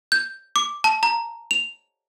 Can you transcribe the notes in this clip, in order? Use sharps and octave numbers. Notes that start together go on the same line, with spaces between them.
G6
D6
A5
A#5
F7